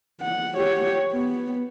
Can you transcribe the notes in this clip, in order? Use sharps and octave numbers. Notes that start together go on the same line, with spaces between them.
F#5
G4 C#5
B3